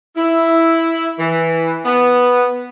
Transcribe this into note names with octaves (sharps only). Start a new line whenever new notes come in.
E4
E3
B3